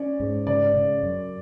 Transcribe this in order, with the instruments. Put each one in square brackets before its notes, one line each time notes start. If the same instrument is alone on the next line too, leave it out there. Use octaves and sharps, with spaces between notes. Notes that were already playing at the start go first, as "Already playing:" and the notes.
Already playing: [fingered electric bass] C#4 [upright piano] D5
[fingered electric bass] G#2
[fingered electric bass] C#3 [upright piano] D5
[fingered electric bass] C#3
F#2